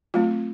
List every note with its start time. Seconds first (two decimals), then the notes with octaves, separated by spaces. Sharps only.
0.14 F#3 A3 C4 F4